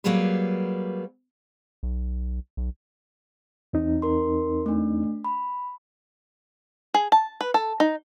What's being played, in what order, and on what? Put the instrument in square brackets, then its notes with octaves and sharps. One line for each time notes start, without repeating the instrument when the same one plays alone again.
[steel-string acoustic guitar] F#3 G3 A#3 B3 G#4 B4
[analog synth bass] B1
B1
[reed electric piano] E2 C4 D#4
[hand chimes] A#4 C6
A3 D4
B5
[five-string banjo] G#4
A5
B4
A4
D#4